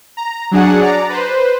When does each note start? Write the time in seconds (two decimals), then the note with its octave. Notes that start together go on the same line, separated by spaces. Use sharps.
0.17 A#5
0.51 F#3 D4 G#4 F#5
0.81 D5 A#5
1.09 B4 C5